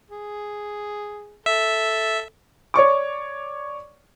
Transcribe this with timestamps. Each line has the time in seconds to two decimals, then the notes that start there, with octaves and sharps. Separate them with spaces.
0.11 G#4
1.46 A4 E5
2.74 C#5 D5 C#6 D6